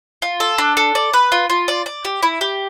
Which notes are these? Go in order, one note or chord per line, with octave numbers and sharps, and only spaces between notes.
F4
A4
D4
A4
D5
B4
F4
F4
D5
D5
G4
E4
G4